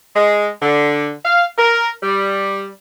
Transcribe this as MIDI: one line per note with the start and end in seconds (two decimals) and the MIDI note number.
0.16 0.48 56
0.62 1.11 50
1.25 1.45 77
1.58 1.88 70
2.03 2.68 55